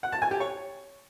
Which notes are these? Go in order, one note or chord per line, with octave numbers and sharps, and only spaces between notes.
F#5
A5
G#5
G4
C#5